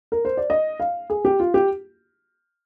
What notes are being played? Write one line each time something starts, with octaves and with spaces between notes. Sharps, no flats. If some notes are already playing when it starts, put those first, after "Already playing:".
A#4
C5
D5
D#5
F5
G#4
G4
F4
G4